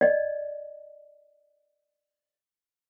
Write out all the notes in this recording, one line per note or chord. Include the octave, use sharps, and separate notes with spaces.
D5 D#5